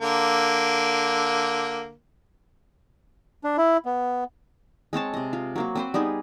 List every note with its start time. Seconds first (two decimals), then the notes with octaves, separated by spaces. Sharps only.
0.01 D3 A#3
3.44 D4
3.58 E4
3.86 B3
4.93 G#3 C4 C#5 A5
5.14 C3 D#5
5.33 F4
5.56 F#3 A#3 F#4
5.75 C4 B4 C5
5.94 G3 B3 D#4 G#4